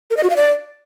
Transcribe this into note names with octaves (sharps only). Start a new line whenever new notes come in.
A#4
D#5
F#4
F5
D5